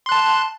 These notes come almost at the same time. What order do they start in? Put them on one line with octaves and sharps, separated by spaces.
C6 F#6 A5